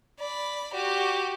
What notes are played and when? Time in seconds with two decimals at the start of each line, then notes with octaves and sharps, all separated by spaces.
0.19 D5 B5
0.74 F#4 G4